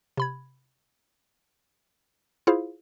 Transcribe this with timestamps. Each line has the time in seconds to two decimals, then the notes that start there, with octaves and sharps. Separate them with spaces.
0.17 C3 B5 G#6
2.47 E4 F4 G#4 C5 F5